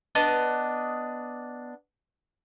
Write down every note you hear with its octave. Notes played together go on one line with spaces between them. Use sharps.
B3 D4 D#5